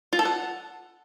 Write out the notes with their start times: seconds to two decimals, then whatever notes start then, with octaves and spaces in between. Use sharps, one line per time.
0.13 F4
0.19 A4
0.25 F#5